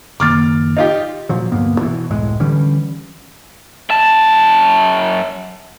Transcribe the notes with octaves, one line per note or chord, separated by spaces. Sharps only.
F#1 D#3 A#3 D6 F6 A6
D#4 F4 G4
A#2 F3 F#3
D2 G2 A#3 B3
B2 E3
F#1 C#2 A2 G#3
D3 E3 G3 C#4
F#2 A5